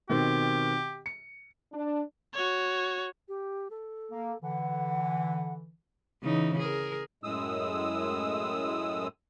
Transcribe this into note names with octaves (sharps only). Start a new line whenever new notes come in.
B2 D#3 C4 G4
C#7
D4
F#4 C#5
G4
A4
A#3
D3 E3 F#5
C#3 E3 D#4
G#4 A#4
F#2 A2 G#3 D#6 E6